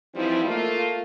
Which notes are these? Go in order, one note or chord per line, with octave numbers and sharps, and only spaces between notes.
E3 F3 G3 C4 D#4 E4
A3 A#3 F4